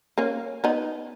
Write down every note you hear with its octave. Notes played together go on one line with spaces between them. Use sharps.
A#3 C#4
B3 D#4